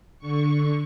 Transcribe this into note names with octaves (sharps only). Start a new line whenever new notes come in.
D3 C#6